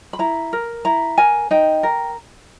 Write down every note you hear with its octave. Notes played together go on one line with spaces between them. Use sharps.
B5
E4 A#5
A#4
E4 A#5
A#4 G#5
D#4 G5
A#4